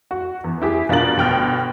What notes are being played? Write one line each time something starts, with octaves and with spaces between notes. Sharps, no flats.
F#4
E2
E4 G4 G#4
B2 D4 F4 A#4 A6 F#7
G1 B2 G5 F6